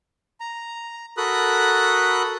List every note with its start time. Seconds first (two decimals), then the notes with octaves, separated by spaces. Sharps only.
0.40 A#5
1.17 F#4 A4 A#4 B5 D#6 F#6